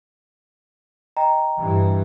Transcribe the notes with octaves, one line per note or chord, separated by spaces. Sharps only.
D#5 G5 A#5
G2 E3